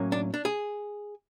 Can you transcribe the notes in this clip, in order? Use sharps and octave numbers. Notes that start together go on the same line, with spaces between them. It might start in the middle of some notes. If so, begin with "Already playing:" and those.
Already playing: A2 F#3 A#3 C#4
D4
D4
G#4